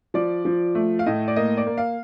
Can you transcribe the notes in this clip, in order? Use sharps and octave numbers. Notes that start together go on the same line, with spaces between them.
F3 D5
F3
A3
F5
A2 D#5
D5
A#3 D#5
D5
A#3
F5